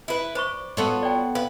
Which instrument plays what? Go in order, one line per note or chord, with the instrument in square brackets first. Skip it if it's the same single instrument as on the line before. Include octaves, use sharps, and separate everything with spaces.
[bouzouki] E4 B4
[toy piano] C5 B5 C#6 [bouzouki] D5
[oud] B3 A4 C#5 [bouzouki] F4 F#4
[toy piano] D5 G5
[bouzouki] B4 [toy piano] F5